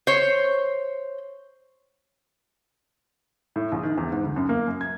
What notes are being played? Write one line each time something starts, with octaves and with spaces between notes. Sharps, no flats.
C5 C#5
A2
A#1
D#3
E2
G#2
D2
F#2
A#3
F#2
G#6